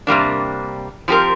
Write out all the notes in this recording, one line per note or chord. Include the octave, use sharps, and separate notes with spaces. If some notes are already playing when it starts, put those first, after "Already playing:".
C3 G3 A#3 D4
F3 C4 G4 A#4